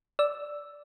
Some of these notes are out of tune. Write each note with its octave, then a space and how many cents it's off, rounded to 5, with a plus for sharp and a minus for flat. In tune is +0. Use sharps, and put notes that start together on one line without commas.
D5 -5 E6 +0